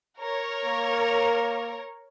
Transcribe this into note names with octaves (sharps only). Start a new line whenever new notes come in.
A#4 C#5
A#3